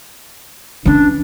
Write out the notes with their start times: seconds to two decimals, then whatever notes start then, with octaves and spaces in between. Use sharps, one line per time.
0.85 E3 C#4 D4